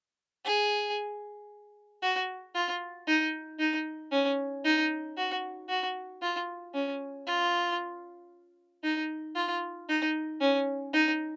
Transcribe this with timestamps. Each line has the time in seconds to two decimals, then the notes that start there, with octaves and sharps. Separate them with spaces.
0.45 G#4
2.02 F#4
2.55 F4
3.07 D#4
3.59 D#4
4.12 C#4
4.64 D#4
5.17 F#4
5.69 F#4
6.22 F4
6.74 C#4
7.27 F4
8.83 D#4
9.36 F4
9.89 D#4
10.41 C#4
10.94 D#4